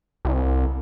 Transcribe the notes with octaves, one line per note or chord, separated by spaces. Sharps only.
C2